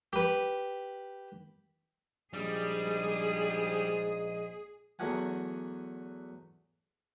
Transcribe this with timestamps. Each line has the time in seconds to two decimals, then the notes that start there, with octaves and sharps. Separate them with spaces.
0.13 G4 B4
2.34 A#1 G#2 G3 G#4 D#5
4.99 E2 F#3 A3 F#4 F#5 G#5